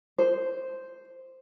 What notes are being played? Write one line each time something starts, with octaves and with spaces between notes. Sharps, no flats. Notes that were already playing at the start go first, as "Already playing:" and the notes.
C5